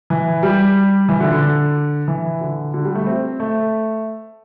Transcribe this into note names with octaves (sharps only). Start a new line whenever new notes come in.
E3
G3
E3
D3
D3
E3
D3
D3
G3
A3
C4
A3